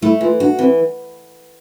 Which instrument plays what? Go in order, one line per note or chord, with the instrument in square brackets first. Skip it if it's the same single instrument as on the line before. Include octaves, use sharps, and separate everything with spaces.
[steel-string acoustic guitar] A3 [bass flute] E4
[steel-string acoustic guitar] E3 [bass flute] F4
[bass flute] D4 [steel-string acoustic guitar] F#4
[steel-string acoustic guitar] E3 [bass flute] C4